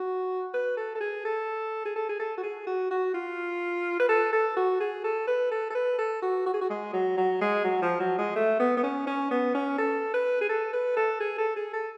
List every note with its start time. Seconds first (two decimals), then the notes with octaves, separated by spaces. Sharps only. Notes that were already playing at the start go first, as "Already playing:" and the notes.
Already playing: F#4
0.54 B4
0.77 A4
0.95 A4
1.00 G#4
1.25 A4
1.85 G#4
1.96 A4
2.09 G#4
2.19 A4
2.38 F#4
2.43 G#4
2.67 F#4
2.91 F#4
3.14 F4
4.00 B4
4.09 A4
4.33 A4
4.57 F#4
4.80 G#4
5.04 A4
5.27 B4
5.52 A4
5.70 A4
5.75 B4
5.99 A4
6.22 F#4
6.46 F#4
6.54 G#4
6.61 F#4
6.70 G#3
6.93 F#3
7.17 F#3
7.41 G#3
7.64 F#3
7.82 F3
8.00 F#3
8.18 G#3
8.36 A3
8.60 B3
8.77 B3
8.83 C#4
9.07 C#4
9.31 B3
9.55 C#4
9.78 A4
10.14 B4
10.41 G#4
10.49 A4
10.73 B4
10.96 A4
11.20 G#4
11.38 A4
11.56 G#4
11.73 A4